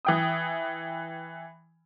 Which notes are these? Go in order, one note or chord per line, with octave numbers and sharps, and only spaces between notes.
E3 G5 D#6